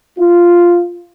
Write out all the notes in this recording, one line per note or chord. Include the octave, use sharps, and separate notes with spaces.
F4